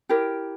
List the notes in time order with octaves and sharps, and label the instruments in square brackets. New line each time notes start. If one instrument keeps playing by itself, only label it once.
[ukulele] E4 G4 A#4